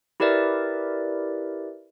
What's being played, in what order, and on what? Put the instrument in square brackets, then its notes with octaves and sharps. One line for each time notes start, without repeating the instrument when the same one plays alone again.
[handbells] E4 G4 A#4 B4 D5 E5